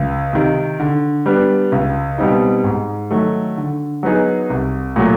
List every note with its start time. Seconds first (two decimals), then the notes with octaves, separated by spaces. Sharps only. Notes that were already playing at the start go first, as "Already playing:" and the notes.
Already playing: C#2
0.33 C3 D#3
0.80 D3
1.26 G3 B3 D4
1.72 C#2
2.18 B2 G3 C4 D#4
2.64 G#2
3.11 D#3 F#3 A3
3.58 D3
4.03 F#3 B3 D#4 G#4
4.50 C2
4.96 A#2 F#3 A3